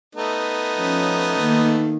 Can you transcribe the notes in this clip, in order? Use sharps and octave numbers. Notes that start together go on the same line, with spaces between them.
A3 B3 D#4
F3 C#4
D#3 A#3